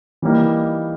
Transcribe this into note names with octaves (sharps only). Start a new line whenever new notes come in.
E3 G3 A#3 D#4